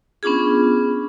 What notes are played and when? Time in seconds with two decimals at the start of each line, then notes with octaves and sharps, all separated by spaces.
0.23 B3 C#4 D4 F4 G#4